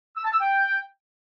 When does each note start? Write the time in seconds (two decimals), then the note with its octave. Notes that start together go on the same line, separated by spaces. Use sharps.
0.17 E6
0.25 A5
0.32 E6
0.40 G5